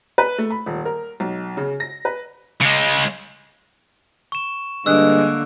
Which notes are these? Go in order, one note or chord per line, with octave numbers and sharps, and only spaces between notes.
B4
A3
B5
D#1
A#4
B1
C#3
A#6
B4
C#3 G#3
C#6 E7
G2 D3 G#3 A#3 E6 F#6